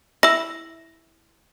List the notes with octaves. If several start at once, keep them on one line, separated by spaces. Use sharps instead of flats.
E4 E6 A#6